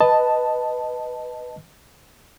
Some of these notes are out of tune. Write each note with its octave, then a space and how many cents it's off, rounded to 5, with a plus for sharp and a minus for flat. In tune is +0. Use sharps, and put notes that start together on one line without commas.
B4 +0 D#5 +0 A5 +0